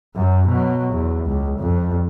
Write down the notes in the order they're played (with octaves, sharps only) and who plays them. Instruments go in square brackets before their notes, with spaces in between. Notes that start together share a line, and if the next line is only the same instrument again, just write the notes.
[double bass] F#2 F#3
B2 F#3
E2
C#2
F2